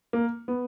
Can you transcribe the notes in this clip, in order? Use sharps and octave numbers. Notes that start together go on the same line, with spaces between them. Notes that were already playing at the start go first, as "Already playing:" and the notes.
A#3
B3